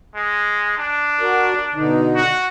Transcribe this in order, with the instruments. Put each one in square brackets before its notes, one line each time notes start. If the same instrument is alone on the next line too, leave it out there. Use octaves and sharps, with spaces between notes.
[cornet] G#3
D4
[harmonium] F#4 A#4 D5
B2 D3 D#4
[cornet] F#4